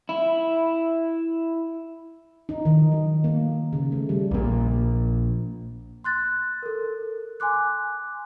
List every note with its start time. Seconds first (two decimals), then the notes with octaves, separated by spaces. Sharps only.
0.09 E4
2.49 D#4
2.65 D#3
2.92 F#3
3.24 A#3
3.73 C#3
3.92 A3
4.09 G3
4.31 A#1 A#2
6.04 C6 F#6 A6
6.63 A4 A#4
7.40 G#5 C6 D6 F#6